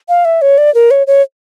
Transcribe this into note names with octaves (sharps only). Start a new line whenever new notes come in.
F5
E5
C#5
D5
A#4
C#5
C#5